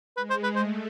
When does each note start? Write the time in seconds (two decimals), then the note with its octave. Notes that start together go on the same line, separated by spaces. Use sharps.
0.16 G#3 B4
0.30 C5
0.43 B4
0.55 A3 C5